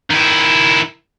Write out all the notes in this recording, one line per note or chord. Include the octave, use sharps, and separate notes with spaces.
D#3 E4